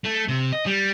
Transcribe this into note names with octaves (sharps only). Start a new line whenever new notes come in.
A3
C3
D#5
G3